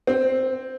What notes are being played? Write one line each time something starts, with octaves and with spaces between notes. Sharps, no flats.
C4